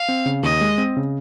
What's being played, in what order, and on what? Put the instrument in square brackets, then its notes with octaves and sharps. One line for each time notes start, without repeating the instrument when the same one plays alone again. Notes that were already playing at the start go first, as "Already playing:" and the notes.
Already playing: [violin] F5
[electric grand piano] C4
C#3
[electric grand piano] D#2 [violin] D#5
[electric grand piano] G#3
C4
C#3